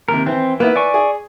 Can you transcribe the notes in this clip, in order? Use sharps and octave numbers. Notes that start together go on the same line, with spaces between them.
D#2 C3 A#4
E3 C4
A#3 B3 E4 B4
D5 G#5 C#6
G#4